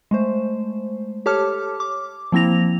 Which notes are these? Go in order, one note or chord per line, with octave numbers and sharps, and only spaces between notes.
G#3 A3 C5
G4 A4 C#5 A5 D6 F6
D6
F3 A#3 C4 E4 A#6 F7